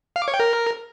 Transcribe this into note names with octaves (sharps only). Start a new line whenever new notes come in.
F5
D6
C#5
G5
A#4